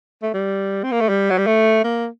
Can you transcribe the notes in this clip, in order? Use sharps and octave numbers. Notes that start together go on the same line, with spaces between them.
A3
G3
C4
A#3
A3
G3
F#3
G3
A3
A#3